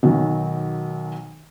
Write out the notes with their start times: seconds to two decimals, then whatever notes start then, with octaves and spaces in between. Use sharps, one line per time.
0.03 B1 D#3 F#3